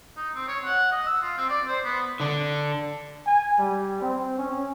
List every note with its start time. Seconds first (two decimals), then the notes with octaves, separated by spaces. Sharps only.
0.17 D#4
0.35 C4
0.48 C#5
0.65 F#5
0.92 D#5
1.06 E6
1.22 F4
1.38 C4
1.50 D5
1.67 C5
1.85 B3
2.20 D3 D4
3.26 G#5
3.59 G3
4.01 C4
4.38 C#4